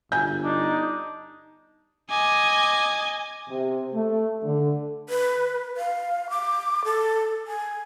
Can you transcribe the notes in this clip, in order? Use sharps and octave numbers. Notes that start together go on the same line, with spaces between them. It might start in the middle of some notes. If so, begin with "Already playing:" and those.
G1 G#5 G6
D4 D#4
D#5 G#5 D6
C3
A3
D3
B4
F5
D6
A4
G#5